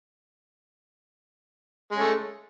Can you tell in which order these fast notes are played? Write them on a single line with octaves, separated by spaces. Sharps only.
G#3 C#4 A3